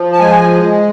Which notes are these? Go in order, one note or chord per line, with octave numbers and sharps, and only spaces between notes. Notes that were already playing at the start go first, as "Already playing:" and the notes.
Already playing: F3
A5
G#3 G#5